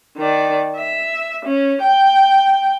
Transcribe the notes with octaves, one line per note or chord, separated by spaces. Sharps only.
D#3 D5
E5
C#4
G5